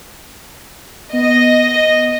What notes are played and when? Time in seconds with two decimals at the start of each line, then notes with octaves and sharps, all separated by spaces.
1.13 B3 D#5